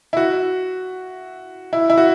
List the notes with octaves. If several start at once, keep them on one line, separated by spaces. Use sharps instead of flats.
E4
F#4
E4
E4
F#4